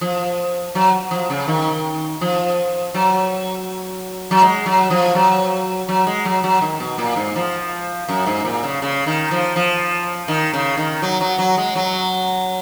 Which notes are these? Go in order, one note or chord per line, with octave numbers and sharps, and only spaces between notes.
F3
F#3
F3
C#3
D#3
F3
F#3
F#3
G#3
F#3
F3
F#3
F#3
G#3
F#3
F#3
D#3
B2
A#2
G#2
F3
F#2
G#2
A#2
C#3
C#3
D#3
F3
F3
D#3
C#3
D#3
F#3
F#3
F#3
G#3
F#3